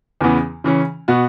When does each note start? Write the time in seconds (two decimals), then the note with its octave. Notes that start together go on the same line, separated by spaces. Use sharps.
0.21 E2 C#3 E3 B3
0.64 C#3 E3 C#4
1.08 B2 B3 F#4